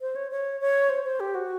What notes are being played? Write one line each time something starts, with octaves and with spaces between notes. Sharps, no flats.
C5
C#5
C#5
C#5
C5
C5
G4
F#4